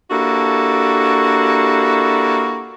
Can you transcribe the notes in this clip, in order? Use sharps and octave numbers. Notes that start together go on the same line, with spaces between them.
A#3 D4 E4 F#4 G4 A4